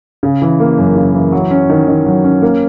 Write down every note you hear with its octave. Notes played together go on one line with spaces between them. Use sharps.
C#3
E3
A#3
F#2
C#3
E3
F#3
C#4
D#3
D#3
F#3
C#4
A#3